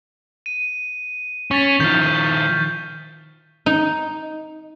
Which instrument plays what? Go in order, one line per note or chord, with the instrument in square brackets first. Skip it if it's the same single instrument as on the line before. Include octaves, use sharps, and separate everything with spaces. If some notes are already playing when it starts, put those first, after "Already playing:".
[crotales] D#7
[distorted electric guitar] C#4 [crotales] C#6 A6 B6
[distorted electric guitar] D#3 F3 [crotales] F6 G6
[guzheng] D#4